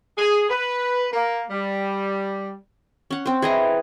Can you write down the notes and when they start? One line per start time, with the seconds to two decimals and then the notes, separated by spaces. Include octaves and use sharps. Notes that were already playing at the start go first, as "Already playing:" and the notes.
0.18 G#4
0.50 B4
1.13 A#3
1.51 G3
3.11 C#4 F#5
3.26 C4 C5
3.42 E3 G#4 D#5 A#5